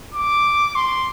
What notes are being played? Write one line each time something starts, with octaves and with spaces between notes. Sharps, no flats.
D6
C6